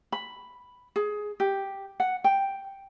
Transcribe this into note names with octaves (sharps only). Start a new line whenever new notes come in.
B5
G#4
G4
F#5
G5